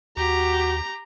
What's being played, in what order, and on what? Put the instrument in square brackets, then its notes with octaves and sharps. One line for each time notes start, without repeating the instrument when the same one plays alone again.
[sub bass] D#2 [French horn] F#4 [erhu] G4 [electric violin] A#5